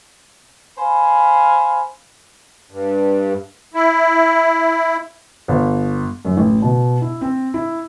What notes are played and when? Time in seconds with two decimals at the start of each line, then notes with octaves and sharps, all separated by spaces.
0.78 C5 F5 G#5 B5
2.71 G2
3.74 E4
5.48 G1
6.25 F#2
6.37 A1
6.62 B2
7.02 E4
7.21 C4
7.54 E4